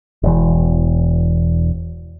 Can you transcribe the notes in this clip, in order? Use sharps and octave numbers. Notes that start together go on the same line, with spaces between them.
E1 E2 E3